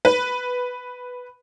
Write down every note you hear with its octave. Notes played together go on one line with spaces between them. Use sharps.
B4